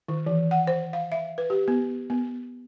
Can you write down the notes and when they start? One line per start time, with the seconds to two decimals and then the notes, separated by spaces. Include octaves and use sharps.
0.08 D#3
0.26 E3
0.51 F#5
0.67 C5
0.93 F5
1.12 E5
1.38 B4
1.50 G4
1.68 B3
2.10 B3